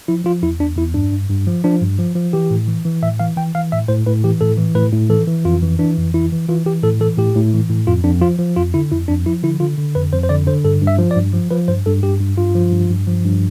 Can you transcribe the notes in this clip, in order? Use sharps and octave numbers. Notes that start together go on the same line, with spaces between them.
F3 E4
F3 F4
E2 E4
E2 D4
E2 E4
G2 D4
G2
G2
F3
F3 D4
G2
F3
F3
E3 G4
A2
E3
E3
A2 E5
E3 F5
E3 G5
E3 F5
A2 E5
A2 C5
A2 B4
E3 G4
A2 A4
E3
A2 B4
A2
E3 A4
E3
F2 F4
E3
E3 D4
F2
E3 E4
E3
E3 F4
E3 G4
A2 A4
E3 A4
A2 G4
A2
E3
A2
F2 F4
F2 D4
F3 F4
F3
F2 F4
D3 E4
F2 E4
F2 D4
F3 E4
D3 E4
D3 F4
D3
F2 B4
F2 C5
C5
D3 D5
D3 C5
G2 A4
G2
E5
F3
D5
G2
F3
F3 B4
G2 C5
G2 A4
G2 G4
G2
G2 F4
F3
G2
G2
F3
G2